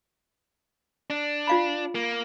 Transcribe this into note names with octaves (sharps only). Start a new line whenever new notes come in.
D4
F4 F5 B5
A#3